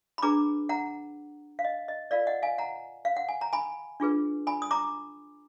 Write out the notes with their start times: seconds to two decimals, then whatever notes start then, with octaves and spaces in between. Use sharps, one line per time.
0.18 B5
0.22 D4 G#4 B4 A#5 D6
0.69 F#5 A#5
1.59 F5
1.64 D#5
1.88 D#5
2.11 F4 A#4 D5 F5
2.27 D#5 F#5
2.42 F5 G#5
2.58 F#5 A#5
3.05 F5
3.16 F#5
3.29 G#5
3.41 A#5
3.53 G#5 B5
4.00 D4 F4 G#4 B4
4.47 G#5 B5
4.62 D#6
4.71 A#5 D6